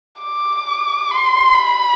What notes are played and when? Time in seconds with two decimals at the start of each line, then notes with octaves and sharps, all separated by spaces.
0.22 D6
1.11 C6
1.55 B5